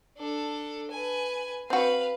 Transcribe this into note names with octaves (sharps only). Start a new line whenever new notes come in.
D4 A4
B4 G#5
C4 F#4 B4 F5